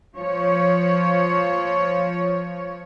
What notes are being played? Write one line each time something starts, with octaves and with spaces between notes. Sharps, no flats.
F3 C#5